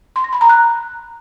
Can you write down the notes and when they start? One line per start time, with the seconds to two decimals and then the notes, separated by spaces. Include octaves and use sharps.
0.16 C6
0.24 A#6
0.33 B5
0.41 A#5
0.49 F#6